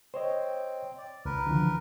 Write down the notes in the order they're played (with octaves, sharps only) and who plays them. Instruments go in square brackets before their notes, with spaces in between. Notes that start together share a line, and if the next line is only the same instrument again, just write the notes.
[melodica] C4 [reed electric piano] C5 C#5 D#5
[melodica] D5
[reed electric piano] C#2 [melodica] A#4 B4
[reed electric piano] D3 E3 F3